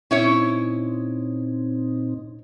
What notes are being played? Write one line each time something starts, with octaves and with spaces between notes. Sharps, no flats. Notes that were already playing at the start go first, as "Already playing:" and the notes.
A#2 C4 C#4 D#4 E4 C#5